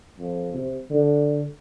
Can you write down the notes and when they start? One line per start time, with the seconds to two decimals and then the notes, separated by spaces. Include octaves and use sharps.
0.19 F2
0.54 C3
0.90 D3